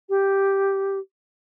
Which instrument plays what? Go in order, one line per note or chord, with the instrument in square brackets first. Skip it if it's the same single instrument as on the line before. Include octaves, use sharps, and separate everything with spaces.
[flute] G4